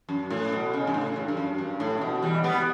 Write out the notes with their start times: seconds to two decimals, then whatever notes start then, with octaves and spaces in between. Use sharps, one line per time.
0.09 F#2
0.30 A2
0.52 B2
0.73 C#3
0.87 G2
0.94 A2
1.16 G2
1.28 G2
1.37 F#2
1.58 G2
1.80 A2
1.97 C#3
2.01 B2
2.22 E3 G3
2.43 G3 B3